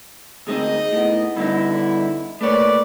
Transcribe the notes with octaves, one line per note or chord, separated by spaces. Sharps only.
D2 G#3 C4 D#4 G#4 D#5
A2 B3
G2 D3 B3 D#4 E4
A3 A#3 B4 C#5 D5